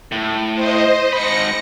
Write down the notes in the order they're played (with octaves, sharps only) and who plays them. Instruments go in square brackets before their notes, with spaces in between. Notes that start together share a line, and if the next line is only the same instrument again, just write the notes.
[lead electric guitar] A2
[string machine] C5 D#5
[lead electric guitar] G#2 B5 [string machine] A#6 C#7